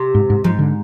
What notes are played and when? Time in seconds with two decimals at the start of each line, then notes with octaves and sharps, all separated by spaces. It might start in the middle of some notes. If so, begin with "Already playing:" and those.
Already playing: C3
0.15 G#2
0.30 G#2
0.44 G#2 F3
0.59 D3